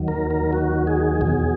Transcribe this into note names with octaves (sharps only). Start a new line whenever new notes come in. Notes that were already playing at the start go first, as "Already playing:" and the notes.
Already playing: D#2 D#3 F#3
A#4
A#4
F#4
G#4
E2 B2 F#3